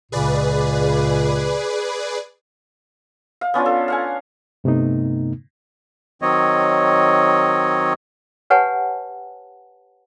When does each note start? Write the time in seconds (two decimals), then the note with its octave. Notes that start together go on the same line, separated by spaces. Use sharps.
0.12 C#2 A#2 C#3 G#4 B4 D5
3.41 F5
3.54 B3 C#4 D4 F4
3.66 A4
3.88 F5 F#5 G#5
4.64 G2 C3 A3 B3 D#4
6.22 D#3 F#3 C4 C#5 D#5
8.50 G4 B4 C#5 F#5 G#5 A5